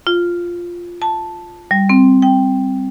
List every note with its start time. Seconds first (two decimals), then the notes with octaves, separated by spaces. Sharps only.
0.07 F4
1.02 A5
1.71 G3
1.89 C4
2.22 G5